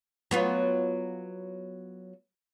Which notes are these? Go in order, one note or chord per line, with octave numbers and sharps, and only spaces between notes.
F#3 B3 F4